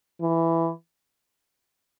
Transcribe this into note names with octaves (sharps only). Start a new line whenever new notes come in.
E3